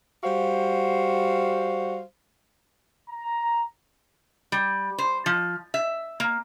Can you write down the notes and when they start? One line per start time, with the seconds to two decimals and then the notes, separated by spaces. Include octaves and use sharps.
0.24 G3 F#4 C5 F5
3.10 A#5
4.52 G3
4.98 C5
5.26 F3
5.74 E5
6.20 A#3